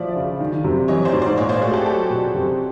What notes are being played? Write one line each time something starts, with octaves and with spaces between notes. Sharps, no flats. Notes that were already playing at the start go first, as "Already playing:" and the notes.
Already playing: F3 D5 E5
C#3
D#3
C3
E3 C#5 D#5
C5 D5
G#2
C5 D5
A#2 C#5 D#5
C5 D5
A3 F#4 G#4
G4 A4
F#3 G4 A4
B2
C3